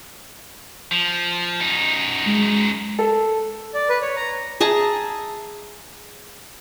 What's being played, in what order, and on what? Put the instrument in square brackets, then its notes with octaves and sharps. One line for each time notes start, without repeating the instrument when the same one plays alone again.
[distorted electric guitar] F3
F#2 D#4
[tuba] G#3
[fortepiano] A4
[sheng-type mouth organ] D5
B4
C#5
A#5
[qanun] G#4 E5 A5 A#5